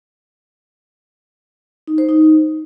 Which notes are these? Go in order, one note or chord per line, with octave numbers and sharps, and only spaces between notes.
D#4
C5
D#4